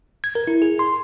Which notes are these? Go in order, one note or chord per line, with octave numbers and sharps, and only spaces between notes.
G#6
A#4
E4
G#4
C6